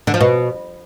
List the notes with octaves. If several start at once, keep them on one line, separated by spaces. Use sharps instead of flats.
D3
F3
B2